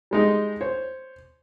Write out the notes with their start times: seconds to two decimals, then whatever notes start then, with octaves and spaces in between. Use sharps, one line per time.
0.11 G3 G#3 D#4
0.61 C5 C#5